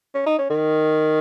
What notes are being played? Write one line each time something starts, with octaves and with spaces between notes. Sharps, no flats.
C#4
D#4
C#4
D#3